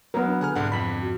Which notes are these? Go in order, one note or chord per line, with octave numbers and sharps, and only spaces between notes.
F#3 B3 A#4
D4
D3 G#4 A4 F#5 G#5 F6
C2 G#2 D3 F#5
F2 B5 B6
F#4